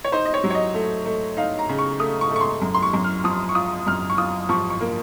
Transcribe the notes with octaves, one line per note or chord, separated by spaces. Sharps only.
C#5
D#4 C5
D#5
C#5
F#3
C#5
D#5
A3
A3
D#4 F5
A#5
C#3
C#6
A3 D#6
C#6
A3
C#6
C6
F#2
C6
C#6
F#2
F6
F3 D#6
C#6
F4 D#6
F#2 F6
C#6
F4 D#6
F3 C#6
C#6
A#3